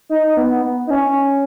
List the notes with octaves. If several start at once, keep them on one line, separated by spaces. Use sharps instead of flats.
D#4
B3
D#4
C#4